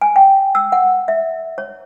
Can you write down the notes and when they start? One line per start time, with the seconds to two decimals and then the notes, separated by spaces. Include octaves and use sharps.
0.02 G#5
0.16 G5
0.55 E6
0.72 F#5
1.08 E5
1.58 C#5